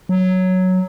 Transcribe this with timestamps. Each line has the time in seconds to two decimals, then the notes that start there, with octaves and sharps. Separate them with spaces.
0.09 F#3